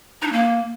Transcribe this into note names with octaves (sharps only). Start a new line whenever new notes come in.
D#4
D4
A#3